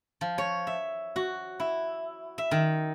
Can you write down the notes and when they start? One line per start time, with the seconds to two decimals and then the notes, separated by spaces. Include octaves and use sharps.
0.21 F3
0.38 C#5
0.67 E5
1.16 F#4
1.60 E4
2.38 E5
2.51 D#3